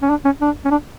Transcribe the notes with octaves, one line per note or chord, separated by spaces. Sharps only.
C#4
D4
C#4
D4
C#4
D4